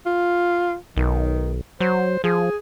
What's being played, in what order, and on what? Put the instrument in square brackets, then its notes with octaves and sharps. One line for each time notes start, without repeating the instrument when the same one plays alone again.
[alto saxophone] F4
[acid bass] B1 [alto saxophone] D#3
[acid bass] F#3 [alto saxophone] C5
[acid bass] F3 [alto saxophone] G#4